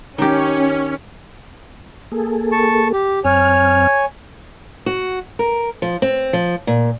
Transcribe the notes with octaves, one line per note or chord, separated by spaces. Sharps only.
D#3 C#4 G4
A#3 G#4 A4
A5 C#6
G4
F#2 C4 C#5 G#5 F6
F#4
A#4
F3
C4
F3
A#2